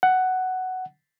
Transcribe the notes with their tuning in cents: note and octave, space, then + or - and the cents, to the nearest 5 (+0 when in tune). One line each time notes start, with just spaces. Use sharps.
F#5 +5